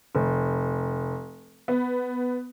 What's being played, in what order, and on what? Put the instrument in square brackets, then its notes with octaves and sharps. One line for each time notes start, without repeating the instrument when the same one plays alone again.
[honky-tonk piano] F1
B3